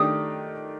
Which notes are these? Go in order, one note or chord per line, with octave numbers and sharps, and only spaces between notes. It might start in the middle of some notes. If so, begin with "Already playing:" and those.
Already playing: D#3 A3 D4 G4 D#6